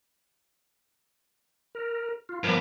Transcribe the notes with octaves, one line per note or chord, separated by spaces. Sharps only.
A#4
F4
G2 F3 B3 A#4 D6